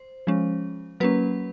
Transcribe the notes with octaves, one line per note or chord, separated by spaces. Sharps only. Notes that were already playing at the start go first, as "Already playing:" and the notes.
Already playing: C5
F3 G#3 C#4
F#3 A#3 C#4 B4